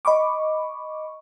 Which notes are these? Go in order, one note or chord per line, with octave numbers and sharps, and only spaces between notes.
D#5 B5 C#6 D6